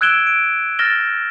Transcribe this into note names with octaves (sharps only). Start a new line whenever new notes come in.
E6 F#6 G#6 D7 E7 G7
D7
F6 A6 A#6 E7 G7